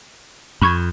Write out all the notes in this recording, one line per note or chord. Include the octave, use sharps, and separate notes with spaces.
F2 B5 C#6 G#6